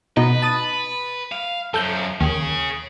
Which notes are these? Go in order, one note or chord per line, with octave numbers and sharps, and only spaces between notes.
B2 D#4 B4
A5 D#6 A6
F5
F#2 F3 A4 G6
D#2 C#4 G#4